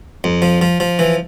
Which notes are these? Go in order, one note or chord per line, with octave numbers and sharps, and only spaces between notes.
F2
F3
F3
F3
E3